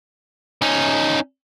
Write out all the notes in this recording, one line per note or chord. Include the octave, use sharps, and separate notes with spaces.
C#4 D#4